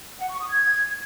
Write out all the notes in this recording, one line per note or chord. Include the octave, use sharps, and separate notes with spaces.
F#5
C#6
D#6
G#6